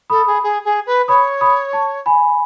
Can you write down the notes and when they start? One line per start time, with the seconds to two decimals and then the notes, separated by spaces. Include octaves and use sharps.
0.10 A4 B5 D#6
0.27 G#4
0.43 G#4
0.65 G#4
0.86 B4
1.08 C#5 B5 D#6
1.41 B5 D#6
1.73 A5 C#6
2.06 G#5 B5